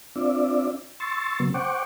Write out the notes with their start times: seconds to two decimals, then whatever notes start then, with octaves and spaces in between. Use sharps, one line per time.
0.16 C4 D4 F4 D5 E5
1.00 C6 C#6 E6 A6
1.40 C#3 F#3 A#3 B3
1.54 C5 F#5 G5 C#6 D6